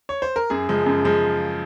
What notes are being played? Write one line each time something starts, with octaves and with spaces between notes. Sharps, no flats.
C#5
C5
A#4
F#2 G#4
C#3 F3 G#3
F#2
C#3 F3 G#3